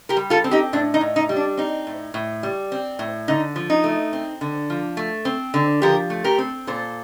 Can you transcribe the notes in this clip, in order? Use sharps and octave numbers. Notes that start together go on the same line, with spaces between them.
G4 A#4
G3
F4 A4
C4
D#4 G4
A2 D4
D#4
A2
D#4
G3
D4
C4 D#4
A2
A2
G3
C4
A2
D3 D#4
F3
D#4
A3
C4
D3
F3
A3
C4
D3
F3 G4 A#4
A3
G4 A#4
C4
A#2 A4 C5